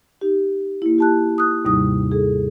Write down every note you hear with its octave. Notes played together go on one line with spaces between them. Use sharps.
D#4 G4
A#3 E4
G4 A5 F#6
D#6 F#6
D#2 G#2 C3 G3 D#4 D#6
G#4 A4